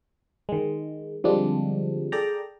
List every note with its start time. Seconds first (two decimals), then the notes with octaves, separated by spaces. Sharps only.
0.49 D#3 G#3
1.24 D3 F3 G3 G#3 C4 D4
2.12 G#4 A4 D5 G5 A#5